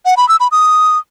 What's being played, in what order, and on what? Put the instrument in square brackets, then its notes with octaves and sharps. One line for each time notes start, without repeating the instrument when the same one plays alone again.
[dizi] F#5
B5
E6
B5
D#6